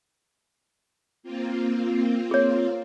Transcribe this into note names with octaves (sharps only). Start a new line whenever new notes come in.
A#3 C4 F4
G#4 C#5